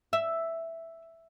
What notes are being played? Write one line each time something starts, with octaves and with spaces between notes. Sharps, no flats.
E5